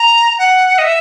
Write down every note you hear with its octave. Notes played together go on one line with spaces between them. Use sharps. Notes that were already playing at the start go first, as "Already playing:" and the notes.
Already playing: A#5
F#5
D#5
E5